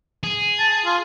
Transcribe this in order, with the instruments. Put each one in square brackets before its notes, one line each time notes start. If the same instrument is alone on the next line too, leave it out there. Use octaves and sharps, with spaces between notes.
[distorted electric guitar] G#4
[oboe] A5
F4